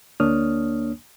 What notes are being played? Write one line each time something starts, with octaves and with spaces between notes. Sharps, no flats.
D2 A#3 D4 C#5 D#6 F6